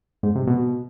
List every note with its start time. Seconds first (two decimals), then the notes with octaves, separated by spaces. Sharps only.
0.23 G#2
0.35 C3
0.47 B2